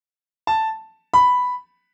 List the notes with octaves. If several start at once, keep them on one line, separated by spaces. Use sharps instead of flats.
A5
B5